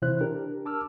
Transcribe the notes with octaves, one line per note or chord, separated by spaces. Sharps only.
C3 E3 E4 C5 F#6
D4 G4 A#4
A5 D6 E6 F6